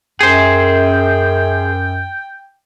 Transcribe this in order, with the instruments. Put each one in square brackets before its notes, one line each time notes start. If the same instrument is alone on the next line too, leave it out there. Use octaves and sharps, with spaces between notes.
[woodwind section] F#2 [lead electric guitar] G#4 C5 [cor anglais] G5